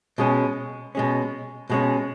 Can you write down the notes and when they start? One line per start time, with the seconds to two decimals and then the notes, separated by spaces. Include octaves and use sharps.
0.18 B2 G#3 C#4
0.95 B2 G#3 C#4
1.70 B2 G#3 C#4